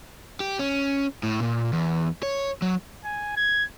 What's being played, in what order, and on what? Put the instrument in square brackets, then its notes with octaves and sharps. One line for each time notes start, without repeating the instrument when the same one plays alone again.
[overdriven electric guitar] G4
C#4
A2
A#2
E2
C#5
F#3
[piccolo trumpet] G#5
G#6